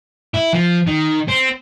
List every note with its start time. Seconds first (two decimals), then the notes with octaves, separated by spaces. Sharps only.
0.34 E4
0.53 F3
0.87 D#3
1.28 C4